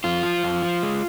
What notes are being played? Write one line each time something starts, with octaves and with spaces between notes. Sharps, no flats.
F2 F4
F3
F2
F3
G#3